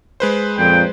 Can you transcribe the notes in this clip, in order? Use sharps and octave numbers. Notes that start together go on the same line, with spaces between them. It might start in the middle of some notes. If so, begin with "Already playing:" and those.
G#3 B4 C5
F2 A#2 G5